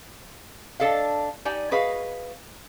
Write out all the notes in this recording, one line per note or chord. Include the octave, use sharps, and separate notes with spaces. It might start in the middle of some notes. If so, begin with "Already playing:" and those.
D4 A4 D#5 F5
D#4 G4 D5 G#5
F#4 G#4 B4 D#5 F5